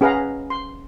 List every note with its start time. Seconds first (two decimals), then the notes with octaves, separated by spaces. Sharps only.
0.01 C#4 G#4 B4 F5 F#5 A#5
0.50 C6